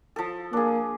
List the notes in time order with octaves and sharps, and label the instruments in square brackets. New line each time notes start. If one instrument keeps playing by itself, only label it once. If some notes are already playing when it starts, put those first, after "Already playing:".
[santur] F3 A4
[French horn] A#3 [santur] D4 G#4